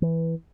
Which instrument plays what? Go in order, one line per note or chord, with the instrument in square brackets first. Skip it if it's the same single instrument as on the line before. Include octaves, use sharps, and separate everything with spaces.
[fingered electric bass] E3